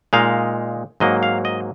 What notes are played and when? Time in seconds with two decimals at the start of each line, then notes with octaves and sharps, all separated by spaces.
0.13 A#2 G#3 D#4 F5
1.00 G#2 F#3 A#3 D#5
1.23 F5
1.45 D#5